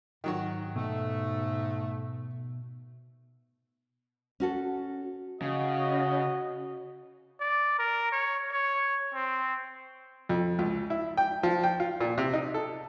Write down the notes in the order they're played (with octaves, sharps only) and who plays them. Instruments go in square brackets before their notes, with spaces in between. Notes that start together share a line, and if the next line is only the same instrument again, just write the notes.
[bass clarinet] G#2 [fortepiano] D#3 F#3 F#4
[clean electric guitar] B2 [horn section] A3
[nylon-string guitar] C#4 F#4 A4
[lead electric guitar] C#3 [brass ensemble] F#4 D#5
[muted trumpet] D5
A#4
C#5
C#5
C4
[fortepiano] F2
C#2
E4
G5
F3
G5
F4
A#2
C3
D#4
A4